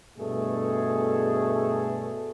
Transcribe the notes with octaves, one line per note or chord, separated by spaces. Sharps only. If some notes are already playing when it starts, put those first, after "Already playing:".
G2 B2 A3 G#4 A4